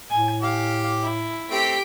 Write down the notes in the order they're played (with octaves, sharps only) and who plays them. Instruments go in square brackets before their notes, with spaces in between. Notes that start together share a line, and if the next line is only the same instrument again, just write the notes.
[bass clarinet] A2 [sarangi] G#5
[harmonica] G4 D6 [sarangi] F5
[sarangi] E4
[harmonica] A3 C4 [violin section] G4 B6 D7